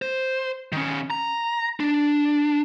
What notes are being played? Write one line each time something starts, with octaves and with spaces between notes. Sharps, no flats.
C5
D#3 C#4
A#5
D4